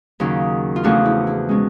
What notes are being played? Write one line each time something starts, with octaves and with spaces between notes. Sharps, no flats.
D#2 C#3 F#3
F4
E2 C#3 F3 A3 D4 F#4
E4
E4
B2 G#3 C#4